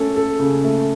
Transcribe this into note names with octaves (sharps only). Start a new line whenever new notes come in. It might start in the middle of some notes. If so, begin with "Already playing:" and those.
Already playing: A3 C#4 A4
A4
C#3
A3